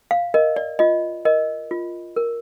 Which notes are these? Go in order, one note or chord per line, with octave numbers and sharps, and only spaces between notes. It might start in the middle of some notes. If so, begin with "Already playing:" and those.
F5
A#4 D#5
D5
F4 D#5
A#4 D#5
F4
A#4